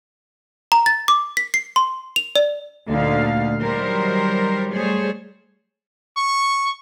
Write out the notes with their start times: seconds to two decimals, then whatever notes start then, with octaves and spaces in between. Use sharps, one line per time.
0.72 A#5
0.86 A6
1.08 D6
1.37 B6
1.54 C7
1.76 C6
2.16 F7
2.36 D5
2.88 D2 A#2 D3 D#4 F5
3.61 D#3 F#3 G3 A#4 C5
4.73 G3 A3 G#4 C5 C#5
6.17 C#6